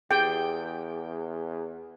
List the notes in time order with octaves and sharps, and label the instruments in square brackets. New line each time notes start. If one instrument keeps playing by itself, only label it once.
[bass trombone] E2 [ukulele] G4 G#4 [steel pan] G5